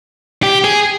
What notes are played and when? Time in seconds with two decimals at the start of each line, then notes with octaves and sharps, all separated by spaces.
0.43 G4
0.64 G#4